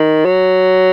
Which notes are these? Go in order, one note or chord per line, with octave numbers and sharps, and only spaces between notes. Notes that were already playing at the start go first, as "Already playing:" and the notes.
Already playing: D#3
F#3